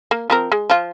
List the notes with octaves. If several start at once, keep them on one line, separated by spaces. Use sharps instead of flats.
A#3
F3 C4 A#4
G#3
F3 F4